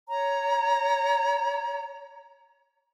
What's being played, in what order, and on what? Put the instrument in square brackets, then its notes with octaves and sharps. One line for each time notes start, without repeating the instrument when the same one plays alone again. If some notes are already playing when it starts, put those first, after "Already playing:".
[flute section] C#5 A#5